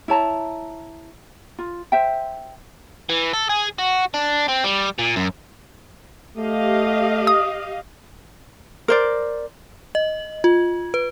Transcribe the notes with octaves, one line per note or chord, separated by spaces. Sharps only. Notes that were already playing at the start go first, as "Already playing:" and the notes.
E4 C#5 A5 A#5
F4
C5 E5 G5
E3
A4
G#4
F#4
D4
C4
G3
A#2
F#2
A3 G4 D#5 F5
D#6
A#4 C5 D5
D#5
F4
B4